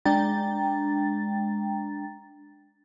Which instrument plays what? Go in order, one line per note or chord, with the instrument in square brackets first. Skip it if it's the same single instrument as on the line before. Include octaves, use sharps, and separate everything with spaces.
[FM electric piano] G#3 D4 G5 A#5 A6